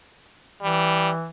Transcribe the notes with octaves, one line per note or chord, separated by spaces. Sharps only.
E3 G3